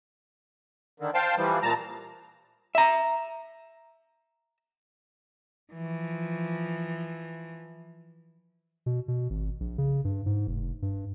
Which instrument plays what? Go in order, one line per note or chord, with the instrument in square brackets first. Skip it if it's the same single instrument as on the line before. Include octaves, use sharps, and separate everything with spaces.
[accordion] D3 D#3
C5 F5 G5 A5
E3 F3 G3
A#2 A5 A#5
[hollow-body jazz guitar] E5 A#5
[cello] E3 F3
[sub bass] B2
B2
G#1
A#1
C#3
G2
G#2
F1
G2